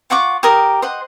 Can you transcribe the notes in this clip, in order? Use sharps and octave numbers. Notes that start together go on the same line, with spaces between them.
F4 F#5 C#6 D6
G4 A#4 D#6
C5 D#5 F#5